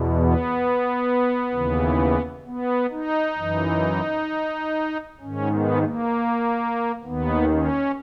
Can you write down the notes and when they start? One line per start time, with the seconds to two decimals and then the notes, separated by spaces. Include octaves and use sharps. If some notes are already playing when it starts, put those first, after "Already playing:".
Already playing: E2 B2
0.15 B3
1.53 D#2 C#3 E3
2.45 B3
2.91 D#4
3.37 F#2 E3
5.20 G#2 D#3 C#4
5.51 B3
5.82 A#3
7.04 D#2 D#3 B3
7.50 C#4